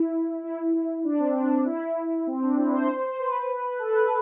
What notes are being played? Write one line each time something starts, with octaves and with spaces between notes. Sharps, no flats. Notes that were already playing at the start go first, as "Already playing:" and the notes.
Already playing: E4
E4
E4
D4
C4
D4
E4
C4
D4
E4
C5
C5
B4
A4
B4